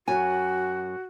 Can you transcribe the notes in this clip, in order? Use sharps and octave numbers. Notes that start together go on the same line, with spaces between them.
F#2 F#4 G#5